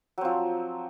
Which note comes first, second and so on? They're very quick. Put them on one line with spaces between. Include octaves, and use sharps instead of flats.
F#3 C4 F3